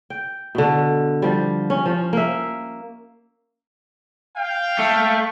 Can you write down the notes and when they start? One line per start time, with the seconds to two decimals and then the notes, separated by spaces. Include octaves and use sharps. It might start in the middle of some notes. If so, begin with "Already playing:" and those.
0.10 G5
0.55 B2 D3
1.22 F3 G3
1.70 C#4
1.86 F3 C#4
2.13 A#3 E5
4.37 F5 G5
4.79 A3